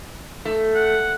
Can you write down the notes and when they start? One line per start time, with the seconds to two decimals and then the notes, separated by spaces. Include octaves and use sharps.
0.45 A3
0.76 F#5